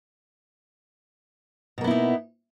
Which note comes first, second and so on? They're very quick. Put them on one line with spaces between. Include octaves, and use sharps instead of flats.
B2 A#3 B3 E4 D#4